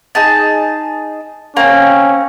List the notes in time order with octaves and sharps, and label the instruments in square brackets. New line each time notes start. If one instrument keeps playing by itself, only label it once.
[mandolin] D#4 G#4 A5
[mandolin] A#3 C4 [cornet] C#4